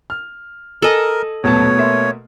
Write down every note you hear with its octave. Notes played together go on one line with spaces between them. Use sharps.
F6
A4 A#4 D#5 G#5 F#7
D#1 B2 F#3 A3 B3 C#5 A5
A#3 E5 C6